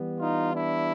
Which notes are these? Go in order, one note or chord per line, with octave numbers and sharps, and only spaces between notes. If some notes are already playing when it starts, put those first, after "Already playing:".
Already playing: E3 G3 B3
D#4 F4
D4 E4